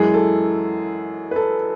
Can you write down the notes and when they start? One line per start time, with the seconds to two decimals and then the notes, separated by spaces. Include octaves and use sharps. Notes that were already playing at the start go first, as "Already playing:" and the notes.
Already playing: F#2 E3 G#3 G#4
0.14 A4
1.31 B4
1.36 A4